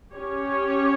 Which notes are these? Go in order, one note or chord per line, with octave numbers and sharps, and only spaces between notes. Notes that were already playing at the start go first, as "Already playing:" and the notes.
C#4 G4 C#5